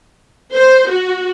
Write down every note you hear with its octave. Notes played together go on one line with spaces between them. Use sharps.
C5
F#4